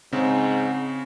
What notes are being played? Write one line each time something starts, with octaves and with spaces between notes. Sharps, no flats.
G#2 C#3 C4